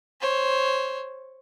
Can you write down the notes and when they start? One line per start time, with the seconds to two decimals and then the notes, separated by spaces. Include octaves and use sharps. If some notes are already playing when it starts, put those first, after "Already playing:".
0.21 C5 C#5